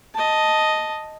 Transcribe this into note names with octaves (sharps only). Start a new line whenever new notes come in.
D#5 A5